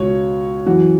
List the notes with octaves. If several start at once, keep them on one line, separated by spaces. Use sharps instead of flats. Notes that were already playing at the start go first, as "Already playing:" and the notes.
Already playing: C#2 B2 C#5
F#2 E3 F#4